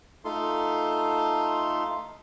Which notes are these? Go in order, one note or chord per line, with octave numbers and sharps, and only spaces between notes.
A3 D#4 F4 A4 C6